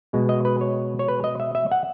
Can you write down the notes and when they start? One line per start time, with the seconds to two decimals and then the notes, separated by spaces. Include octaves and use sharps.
0.13 B2 G#3 B3
0.29 D#5
0.45 B4
0.61 C#5
0.99 C#5
1.08 B4
1.24 D#5
1.40 E5
1.55 E5
1.71 F#5